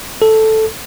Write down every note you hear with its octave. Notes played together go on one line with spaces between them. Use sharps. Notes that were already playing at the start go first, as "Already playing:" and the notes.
A4